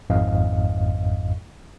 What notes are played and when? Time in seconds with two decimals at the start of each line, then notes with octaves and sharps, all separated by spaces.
0.10 G#1 F2 G#2 D#5 F5